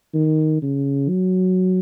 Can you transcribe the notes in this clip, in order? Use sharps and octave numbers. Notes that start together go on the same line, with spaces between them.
D#3
C#3
F#3